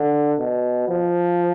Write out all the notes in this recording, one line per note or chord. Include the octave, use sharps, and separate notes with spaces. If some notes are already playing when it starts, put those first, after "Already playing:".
Already playing: D3
B2
F3